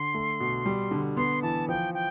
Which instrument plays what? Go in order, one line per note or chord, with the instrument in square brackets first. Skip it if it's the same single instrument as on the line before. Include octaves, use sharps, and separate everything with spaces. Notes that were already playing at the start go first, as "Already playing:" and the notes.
Already playing: [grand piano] D3 [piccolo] C6
[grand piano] A3
B2
G3
D3
[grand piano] B3 [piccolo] C6
[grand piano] E3 [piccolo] A5
[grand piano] F3 [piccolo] G5
[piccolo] G5